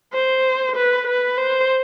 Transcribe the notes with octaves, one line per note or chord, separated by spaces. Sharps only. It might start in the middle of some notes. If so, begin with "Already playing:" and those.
C5
B4
B4
C5